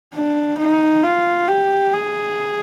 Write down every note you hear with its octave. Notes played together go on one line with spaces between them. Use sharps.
D4
D#4
F4
G4
G#4